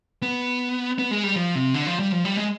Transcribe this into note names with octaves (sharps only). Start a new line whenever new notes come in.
B3
B3
G#3
G3
F3
C3
D3
F3
G3
F3
G3
G#3